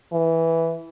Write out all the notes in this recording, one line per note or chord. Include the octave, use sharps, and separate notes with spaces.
E3